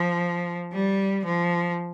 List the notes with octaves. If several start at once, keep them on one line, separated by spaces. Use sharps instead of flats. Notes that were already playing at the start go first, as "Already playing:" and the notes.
Already playing: F3
G3
F3